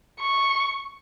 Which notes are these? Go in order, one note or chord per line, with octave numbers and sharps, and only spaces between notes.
C#6